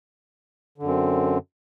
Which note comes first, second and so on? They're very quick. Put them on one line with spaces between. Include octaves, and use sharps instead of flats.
D3 F#2 C4